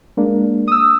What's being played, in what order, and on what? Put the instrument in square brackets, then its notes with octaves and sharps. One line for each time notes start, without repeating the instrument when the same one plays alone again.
[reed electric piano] G#3 A#3 D4
[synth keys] D#6 E6